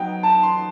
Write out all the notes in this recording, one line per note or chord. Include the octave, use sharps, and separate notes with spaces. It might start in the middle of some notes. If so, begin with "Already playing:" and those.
Already playing: F#3 B3 D#4 G5
A5
C6